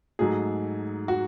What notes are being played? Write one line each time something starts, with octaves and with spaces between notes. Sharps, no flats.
G#2 F#3 A3 G#4
F#4